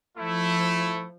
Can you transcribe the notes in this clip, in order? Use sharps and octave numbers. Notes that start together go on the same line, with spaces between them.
F3 A3 E4